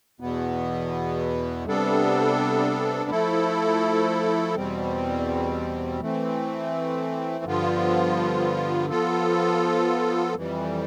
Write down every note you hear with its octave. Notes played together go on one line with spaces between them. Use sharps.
E2 B2 B3
C3 G3 B3 D4 A4
F3 A3 E4 A4
E2 B2 G3 C4
E3 A3 C4
G2 D3 F3 B3 F4
F3 B3 F4 A4
F2 E3 G3